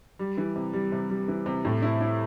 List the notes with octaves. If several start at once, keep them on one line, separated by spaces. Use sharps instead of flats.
G3
E3
C3
G3
C3
G3
E3
C3
A2
E4
E4